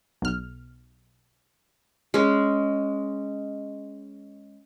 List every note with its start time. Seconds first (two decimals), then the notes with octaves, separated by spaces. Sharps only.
0.22 B1 F6
2.14 G#3 C#4